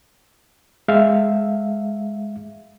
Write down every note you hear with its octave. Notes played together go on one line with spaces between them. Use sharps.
G#3 E5 F5